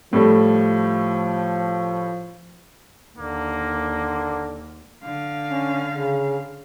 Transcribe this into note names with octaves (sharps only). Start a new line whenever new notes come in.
A2 F3 G3 A3
D#2 D3 A#3
D3 F5
C#4
C#3